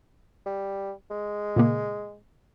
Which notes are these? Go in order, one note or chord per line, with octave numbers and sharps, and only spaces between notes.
G3
G#3
A#2 C#3 A#3